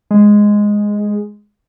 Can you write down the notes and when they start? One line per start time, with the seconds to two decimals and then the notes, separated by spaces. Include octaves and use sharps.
0.11 G#3